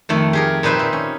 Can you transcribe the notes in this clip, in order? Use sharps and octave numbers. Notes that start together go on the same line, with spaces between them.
F2 D#3 A3
G4 G#4 A#4
A#2 D#4 G4 B4 C5 E5
C4
C#4